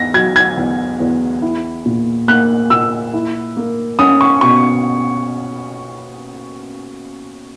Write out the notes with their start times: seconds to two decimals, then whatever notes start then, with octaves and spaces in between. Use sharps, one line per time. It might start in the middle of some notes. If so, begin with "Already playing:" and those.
Already playing: E2 A#6
0.14 F#3 G#6
0.36 G#6
0.57 E2
1.00 E2
1.42 E4
1.86 A#2
2.28 A#3 F#6
2.70 A#2 E6
3.14 E4
3.57 A#3
3.99 C#4 D#6
4.21 C#6
4.41 B2 C#6